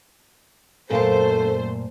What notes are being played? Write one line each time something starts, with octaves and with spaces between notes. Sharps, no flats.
F#2 A#2 A3 A4 C5 F5 A5